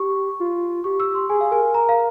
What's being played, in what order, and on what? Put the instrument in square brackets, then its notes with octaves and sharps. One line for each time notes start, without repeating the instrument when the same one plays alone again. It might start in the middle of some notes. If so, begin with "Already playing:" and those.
Already playing: [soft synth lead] G4 [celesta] C#6
[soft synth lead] F4
[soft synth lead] G4 [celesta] C#6
[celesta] E6
C6
[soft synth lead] G#4 [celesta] G#5
[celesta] F5
[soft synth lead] A#4 [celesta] G#5
[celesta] A#5
F5